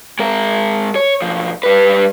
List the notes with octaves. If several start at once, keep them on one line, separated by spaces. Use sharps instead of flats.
G#3 A#4
C#5
B1 F3
G3 B4